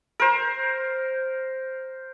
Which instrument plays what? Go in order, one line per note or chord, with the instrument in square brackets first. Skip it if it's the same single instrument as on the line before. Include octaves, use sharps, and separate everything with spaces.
[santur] A#4 C5